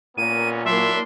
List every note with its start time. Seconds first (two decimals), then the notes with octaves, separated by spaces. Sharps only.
0.18 A#2 A#3 B3 C#4 D#7
0.65 F#3 A#3 D4 E4 E5 C6